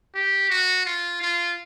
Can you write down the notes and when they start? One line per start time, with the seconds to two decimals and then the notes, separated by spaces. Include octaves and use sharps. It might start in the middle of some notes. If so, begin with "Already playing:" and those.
0.15 G4
0.50 F#4
0.86 F4
1.22 F4